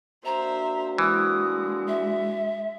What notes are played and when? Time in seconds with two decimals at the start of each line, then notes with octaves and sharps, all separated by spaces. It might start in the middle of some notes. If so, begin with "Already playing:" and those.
0.25 A#3 D4 F#4 C5 E5 A#5
0.98 E3 G#3 D#6
1.87 E5